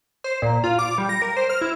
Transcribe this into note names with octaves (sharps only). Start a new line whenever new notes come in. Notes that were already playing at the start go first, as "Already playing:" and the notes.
C5
A#2
F4
D6
G3
A#6
A#4
C5
F6
E4